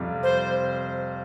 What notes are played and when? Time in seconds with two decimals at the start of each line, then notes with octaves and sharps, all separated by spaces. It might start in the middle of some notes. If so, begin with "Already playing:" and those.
Already playing: F2 C3 G3
0.23 C5